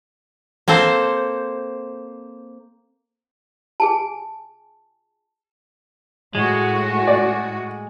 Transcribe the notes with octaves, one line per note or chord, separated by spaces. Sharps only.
A#3 C4 A4 C5
G#4 G#5 A5
A2 G#3 F#4
D5